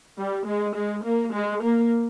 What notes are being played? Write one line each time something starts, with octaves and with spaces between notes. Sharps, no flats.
G3
G#3
G#3
A#3
G#3
A#3